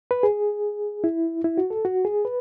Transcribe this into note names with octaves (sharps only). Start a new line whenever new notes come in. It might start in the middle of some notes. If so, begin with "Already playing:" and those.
B4
G#4
E4
E4
F#4
A4
F#4
G#4
B4